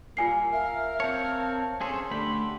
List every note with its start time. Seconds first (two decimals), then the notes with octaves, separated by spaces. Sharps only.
0.17 A#2 G3 A#3 F4 G#5 C7
0.53 A#4 E5 F5
1.00 C4 C#5 A5 C#7
1.81 C#4 G#4 A4 C5 C#5 C6
2.11 D3 A3 G4 B5